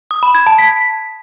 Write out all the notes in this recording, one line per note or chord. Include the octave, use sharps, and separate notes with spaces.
D#6
B5
G#6
A5
B6